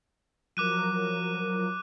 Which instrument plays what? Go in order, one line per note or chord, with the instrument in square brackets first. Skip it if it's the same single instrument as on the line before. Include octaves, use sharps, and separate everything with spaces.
[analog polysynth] F3 F#3 A#4 [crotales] D6 F#6 D#7